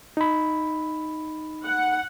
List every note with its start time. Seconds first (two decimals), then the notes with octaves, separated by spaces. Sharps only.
0.17 D#4 B5
1.64 F#5